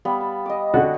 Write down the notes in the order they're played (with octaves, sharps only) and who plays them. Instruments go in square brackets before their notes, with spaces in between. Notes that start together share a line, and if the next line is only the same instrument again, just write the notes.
[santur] G3 B3 F5
A5
D#5 D6
[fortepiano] D3 F#4